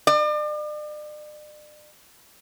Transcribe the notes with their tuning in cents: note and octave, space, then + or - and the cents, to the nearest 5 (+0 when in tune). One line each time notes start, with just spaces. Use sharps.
D5 +40